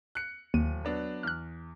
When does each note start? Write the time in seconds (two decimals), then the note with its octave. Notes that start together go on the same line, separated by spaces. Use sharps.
0.15 F#6 C#7
0.54 D1 D#2 D#7
0.85 F#3 B3 D4
1.23 E2 F6 F#6